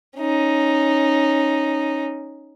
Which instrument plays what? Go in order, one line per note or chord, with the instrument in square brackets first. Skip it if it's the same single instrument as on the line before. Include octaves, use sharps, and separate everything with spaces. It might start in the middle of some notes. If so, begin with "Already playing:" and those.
[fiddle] C#4 D#4